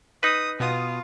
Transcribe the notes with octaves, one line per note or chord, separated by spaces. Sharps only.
D#4 B4 D#6
B2 B3 F4 D#6